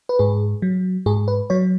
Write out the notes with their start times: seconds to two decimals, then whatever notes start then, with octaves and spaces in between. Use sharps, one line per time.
0.09 B4
0.19 G#2 G#4
0.62 F#3
1.06 G#2 G#4
1.28 B4
1.50 F#3 C#5